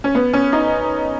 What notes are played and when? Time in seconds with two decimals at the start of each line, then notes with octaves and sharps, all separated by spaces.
0.04 C#4
0.15 B3
0.33 C#4
0.53 D#4